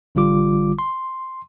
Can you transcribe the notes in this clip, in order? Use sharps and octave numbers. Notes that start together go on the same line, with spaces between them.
A1 D3 G3 F4 D6
C6